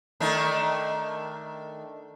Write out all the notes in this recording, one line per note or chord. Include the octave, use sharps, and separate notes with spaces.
D#3 A3 D4